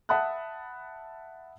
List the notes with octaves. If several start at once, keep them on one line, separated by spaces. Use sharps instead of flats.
E5 F#5 A5 B5 D#6 F#6